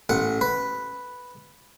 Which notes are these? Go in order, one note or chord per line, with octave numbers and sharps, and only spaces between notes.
A1 F#5
B4